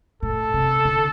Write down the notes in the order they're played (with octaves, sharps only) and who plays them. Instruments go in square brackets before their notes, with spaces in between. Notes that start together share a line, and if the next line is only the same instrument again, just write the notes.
[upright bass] A2 [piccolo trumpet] A4
[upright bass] C3
D3